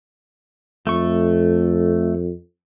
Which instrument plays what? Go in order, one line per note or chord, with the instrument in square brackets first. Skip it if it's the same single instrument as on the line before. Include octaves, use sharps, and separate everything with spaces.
[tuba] F2 [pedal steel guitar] A3 C#6